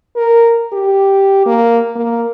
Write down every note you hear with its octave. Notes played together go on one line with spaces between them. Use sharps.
A#4
G4
A#3
A#3